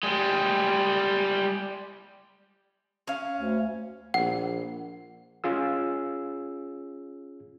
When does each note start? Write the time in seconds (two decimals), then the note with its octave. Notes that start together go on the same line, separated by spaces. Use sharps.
0.03 G3 G#3
3.07 C#4 F5
3.38 D2
4.14 A#1 F#5
5.44 C#4 F4 G#4 E6